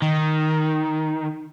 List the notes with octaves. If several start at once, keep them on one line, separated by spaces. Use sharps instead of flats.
D#3